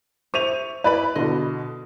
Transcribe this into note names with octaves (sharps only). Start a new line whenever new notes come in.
C5 E5 C#6 D#7 F7
E4 B4 D5 B5
B2 D3 D#5